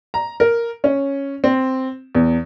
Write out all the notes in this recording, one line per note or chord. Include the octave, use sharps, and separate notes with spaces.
A#5
A#4
C#4
C4
E2